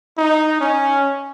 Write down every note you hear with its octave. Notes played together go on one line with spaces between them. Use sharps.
D#4
C#4